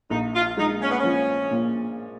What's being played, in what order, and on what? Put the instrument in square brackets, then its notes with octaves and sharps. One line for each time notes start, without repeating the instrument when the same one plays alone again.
[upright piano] A#1 [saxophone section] D#4
[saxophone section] F4
[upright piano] G#3 [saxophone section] D#4
[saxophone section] C#4
B3
C#4
[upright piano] F3
A#2